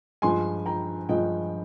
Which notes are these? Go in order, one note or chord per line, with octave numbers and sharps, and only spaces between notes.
G2 F3 G#3 G#5 C6
G5 A#5
G2 F3 G#3 D#5 G5